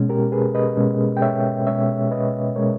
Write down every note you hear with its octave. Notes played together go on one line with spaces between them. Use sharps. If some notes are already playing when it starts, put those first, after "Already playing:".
Already playing: B2 G#3 C#4
G4 A#4
G#4 B4
B4 D#5
B2 G#3 C#4
G5
C#5 E5
B2 G#3 C#4 C#5 E5
B4 D#5
B2 G#3 C#4 A#4 C#5